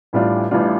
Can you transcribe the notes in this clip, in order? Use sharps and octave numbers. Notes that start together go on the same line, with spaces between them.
A1 A2 G3 D4 F4
A1 A2 G3 D4 F4